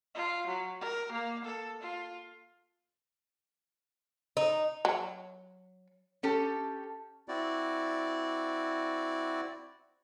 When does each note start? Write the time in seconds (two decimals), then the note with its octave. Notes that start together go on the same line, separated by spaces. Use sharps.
0.15 F4
0.47 F#3
0.81 A#4
1.12 A#3
1.45 A4
1.81 F4
4.37 D#4
4.85 F#3
6.23 C#4 G4 A4
7.28 C4 E4 F#4 D5